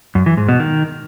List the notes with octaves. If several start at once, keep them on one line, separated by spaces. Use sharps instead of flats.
F#2
E3
G#2
B2
D#3